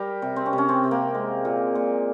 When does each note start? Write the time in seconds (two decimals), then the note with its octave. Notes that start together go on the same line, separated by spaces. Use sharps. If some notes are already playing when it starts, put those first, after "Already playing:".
Already playing: G3 G4 A#4
0.22 C3
0.36 C4
0.46 C#4
0.53 C3
0.58 C#4
0.69 C4
0.83 C3
0.91 A#3
1.14 G#3
1.45 A#2
1.75 A#2